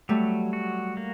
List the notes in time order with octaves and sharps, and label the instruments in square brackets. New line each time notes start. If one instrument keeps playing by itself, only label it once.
[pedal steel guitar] F#3 [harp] G3 A3
[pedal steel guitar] F#4
A#3